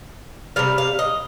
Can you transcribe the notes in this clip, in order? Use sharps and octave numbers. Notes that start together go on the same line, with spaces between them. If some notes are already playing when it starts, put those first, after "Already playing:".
C3 G3 F5
F5
D#5